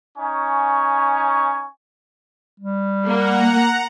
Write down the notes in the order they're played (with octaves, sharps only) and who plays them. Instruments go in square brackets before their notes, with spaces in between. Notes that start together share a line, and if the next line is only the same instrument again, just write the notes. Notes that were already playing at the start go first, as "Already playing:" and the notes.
[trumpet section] C#4 D#4 G#5 C#6
[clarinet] G3
[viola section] A#3 [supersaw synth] F#5 A#5